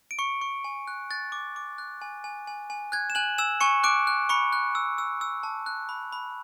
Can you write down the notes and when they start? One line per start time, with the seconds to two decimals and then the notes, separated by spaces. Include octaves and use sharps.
0.11 D7
0.19 C#6 C#7
0.41 C#6
0.64 G#5
0.87 F#6
1.11 F#6 A6
1.32 D6
1.56 D6
1.78 F#6
2.02 G#5
2.24 G#5
2.47 G#5
2.70 G#5
2.92 F#6 G#6
3.10 E7
3.15 G#5 F#6 F#7
3.38 G#5 E6 E7
3.61 G#5 C#6 C#7
3.84 D6 F#6 D7
4.07 F#6
4.29 B5 C#6 C#7
4.53 F#6
4.75 E6
4.98 E6
5.21 E6
5.43 A5
5.66 F#6
5.89 B5
6.12 B5